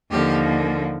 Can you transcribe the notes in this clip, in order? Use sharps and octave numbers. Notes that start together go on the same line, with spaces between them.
D#2 D3 F3 A#3 G4